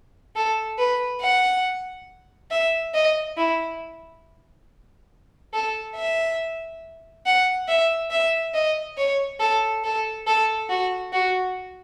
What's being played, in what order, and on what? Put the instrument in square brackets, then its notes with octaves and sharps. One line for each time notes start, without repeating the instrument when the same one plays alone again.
[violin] A4
B4
F#5
E5
D#5
E4
A4
E5
F#5
E5
E5
D#5
C#5
A4
A4
A4
F#4
F#4